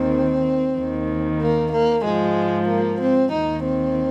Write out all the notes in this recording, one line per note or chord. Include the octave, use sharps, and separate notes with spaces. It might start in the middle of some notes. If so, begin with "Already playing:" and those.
Already playing: D#2 D#3 C4
D#2 D#3
A#3
A#3
G#2 F3 G#3
A#3
C4
D#2 D#3 D#4
C4